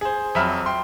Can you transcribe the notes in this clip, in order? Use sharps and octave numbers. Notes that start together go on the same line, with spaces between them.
G#4 C5
F2 F#3 E5 B5 F6
G5 C6